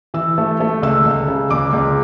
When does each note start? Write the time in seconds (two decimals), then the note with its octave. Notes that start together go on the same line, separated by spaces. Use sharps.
0.14 E3 E6
0.38 A3
0.60 A3
0.82 C#2 E6
1.06 C#2
1.28 C#3
1.50 C#2 D6
1.73 C#2